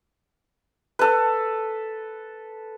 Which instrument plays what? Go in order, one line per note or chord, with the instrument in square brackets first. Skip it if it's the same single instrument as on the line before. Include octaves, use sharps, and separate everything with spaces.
[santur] A4 B4